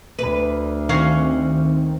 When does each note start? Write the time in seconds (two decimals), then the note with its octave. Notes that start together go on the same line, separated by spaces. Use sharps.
0.19 D2 B4
0.89 D#3 C4 C#4 F#4 F5